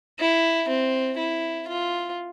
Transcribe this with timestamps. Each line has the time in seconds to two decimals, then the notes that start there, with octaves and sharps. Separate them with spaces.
0.19 E4
0.69 C4
1.18 E4
1.68 F4